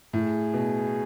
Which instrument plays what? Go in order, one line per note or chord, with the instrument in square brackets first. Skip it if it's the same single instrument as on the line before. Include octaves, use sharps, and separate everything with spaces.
[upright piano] A2 [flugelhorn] G#4
[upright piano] B2